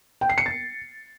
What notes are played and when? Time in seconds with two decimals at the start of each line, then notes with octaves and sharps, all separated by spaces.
0.21 G5
0.29 C7
0.38 C#7
0.46 A6